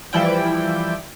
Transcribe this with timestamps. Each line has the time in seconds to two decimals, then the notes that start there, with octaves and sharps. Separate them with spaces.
0.13 E3 F3 G3 E4 D5 G5